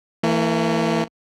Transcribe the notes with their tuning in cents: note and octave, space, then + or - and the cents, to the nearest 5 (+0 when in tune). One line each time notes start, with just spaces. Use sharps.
E3 +0 A#3 -45